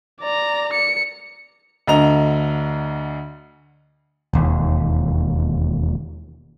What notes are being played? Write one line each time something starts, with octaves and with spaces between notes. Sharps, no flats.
D5 A#5
C#7
D2 D3 D#5 A#5 F7
E1 D#2